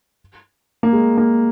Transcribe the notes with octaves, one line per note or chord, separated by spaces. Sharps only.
A#3
G#3
A#3